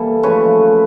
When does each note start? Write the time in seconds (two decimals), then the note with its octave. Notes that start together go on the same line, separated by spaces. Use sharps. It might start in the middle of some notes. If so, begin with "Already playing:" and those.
Already playing: E3 G3 A#3 A4
0.23 C#3 F3 A3 B4 C#5